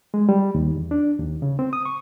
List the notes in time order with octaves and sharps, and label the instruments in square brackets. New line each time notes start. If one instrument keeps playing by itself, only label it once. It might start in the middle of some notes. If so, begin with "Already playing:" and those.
[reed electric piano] G#3
G3
D#2
E2
D4
D#2
C#3
C4
D#6
C#6